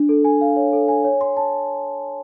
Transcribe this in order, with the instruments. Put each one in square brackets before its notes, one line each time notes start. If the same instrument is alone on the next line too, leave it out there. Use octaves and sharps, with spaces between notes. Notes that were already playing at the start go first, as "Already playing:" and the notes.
Already playing: [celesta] D4
A4
G#5
F5
C#5
A4
G#5
C#5
C6
A5